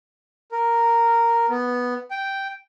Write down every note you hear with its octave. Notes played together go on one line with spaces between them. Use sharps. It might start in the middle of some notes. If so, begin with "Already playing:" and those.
A#4
B3
G5